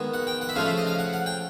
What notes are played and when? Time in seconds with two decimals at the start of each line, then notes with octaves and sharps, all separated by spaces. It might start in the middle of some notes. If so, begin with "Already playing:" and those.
Already playing: D#3 G#3 B3
0.14 F#5
0.27 G5
0.41 F#5
0.49 E5
0.56 C#3 F3 A3 F5
0.66 E5
0.78 D#5
0.87 F5
0.99 F#5
1.13 F#5
1.26 G5